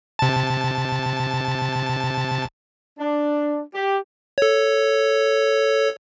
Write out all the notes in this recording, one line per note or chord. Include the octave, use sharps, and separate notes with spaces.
C3 A5
D4
G4
A4 C#5